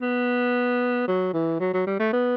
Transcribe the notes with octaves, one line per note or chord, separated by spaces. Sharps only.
B3
F#3
E3
F#3
F#3
G3
A3
B3